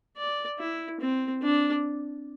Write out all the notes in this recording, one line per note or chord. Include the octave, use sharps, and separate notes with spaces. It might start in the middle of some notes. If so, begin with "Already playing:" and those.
D5
E4
C4
D4